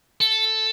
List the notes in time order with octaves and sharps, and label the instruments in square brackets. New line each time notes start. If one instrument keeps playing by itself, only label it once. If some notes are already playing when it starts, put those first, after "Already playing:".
[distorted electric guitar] A4